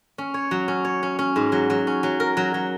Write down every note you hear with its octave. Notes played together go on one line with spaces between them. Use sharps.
C#4
C#5
F#3
C#4
C#5
C#4
C#4
G#2
F#3
F#3
C#4
F#3
A#4
F#3
F#3